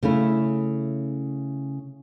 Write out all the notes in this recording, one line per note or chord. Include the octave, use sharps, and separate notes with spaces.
C#3 A3 C#4 E4